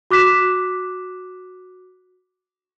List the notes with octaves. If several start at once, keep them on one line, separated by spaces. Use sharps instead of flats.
F#4 D6 F#6 B6 E7